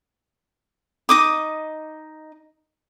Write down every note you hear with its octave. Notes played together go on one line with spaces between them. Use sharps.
D#4 D6 D#6